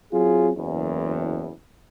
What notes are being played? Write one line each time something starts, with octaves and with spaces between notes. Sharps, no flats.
F#3 C4 F4 G#4
F#1 E2